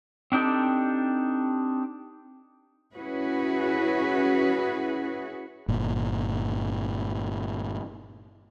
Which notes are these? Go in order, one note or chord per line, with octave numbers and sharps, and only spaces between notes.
C4 D4 D#4 G4 A4
C#4 E4 F#4 G#4 B4
G1 A#2